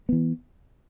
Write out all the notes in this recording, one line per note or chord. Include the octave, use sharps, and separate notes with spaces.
E3 B3